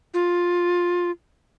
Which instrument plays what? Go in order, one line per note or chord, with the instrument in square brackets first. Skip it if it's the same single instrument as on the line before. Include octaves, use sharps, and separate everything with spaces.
[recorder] F4